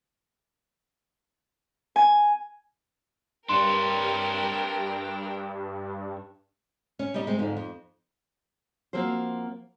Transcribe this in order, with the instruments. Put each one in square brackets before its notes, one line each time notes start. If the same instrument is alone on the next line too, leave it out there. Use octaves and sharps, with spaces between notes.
[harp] G#5
[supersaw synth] G2 [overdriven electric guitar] D4 C#5 [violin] A#4 G5 [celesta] C6
[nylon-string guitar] C#4
G3 D#4 D#5
G#3 C4
F2 G#2 D3
F2
F3 A#3 C4 F#4 C5